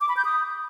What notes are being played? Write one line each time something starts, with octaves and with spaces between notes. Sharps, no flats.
D6
B5
G6
D#6